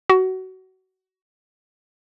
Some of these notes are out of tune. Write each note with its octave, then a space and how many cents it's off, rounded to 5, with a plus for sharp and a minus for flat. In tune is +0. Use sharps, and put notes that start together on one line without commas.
F#4 +20